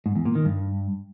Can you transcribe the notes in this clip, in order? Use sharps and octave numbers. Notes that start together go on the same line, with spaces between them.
G#2
E2
A#2
D#3
G2